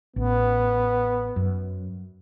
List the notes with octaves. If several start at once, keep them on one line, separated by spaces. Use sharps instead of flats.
A1 B3
F#2